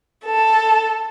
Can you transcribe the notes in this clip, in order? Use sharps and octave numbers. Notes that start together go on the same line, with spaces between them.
A4